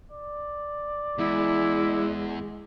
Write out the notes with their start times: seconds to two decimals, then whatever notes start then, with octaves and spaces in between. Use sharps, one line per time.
0.12 D5
1.19 E2 G#3 E4